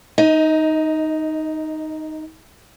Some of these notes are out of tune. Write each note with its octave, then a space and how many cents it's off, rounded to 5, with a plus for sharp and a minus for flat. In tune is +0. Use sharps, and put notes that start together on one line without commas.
D#4 +0 D#5 +25